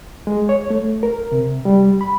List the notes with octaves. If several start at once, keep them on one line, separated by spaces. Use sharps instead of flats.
G#3
C#5
A3
A#4
C3
G3
B5